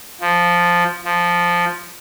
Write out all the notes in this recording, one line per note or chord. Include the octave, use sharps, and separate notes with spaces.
F3
F3